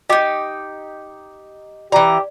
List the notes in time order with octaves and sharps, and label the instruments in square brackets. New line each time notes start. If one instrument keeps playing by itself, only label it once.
[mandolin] D#4 G4 [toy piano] D#5 D6
[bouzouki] E3 A#5 [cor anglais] G4 [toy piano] D5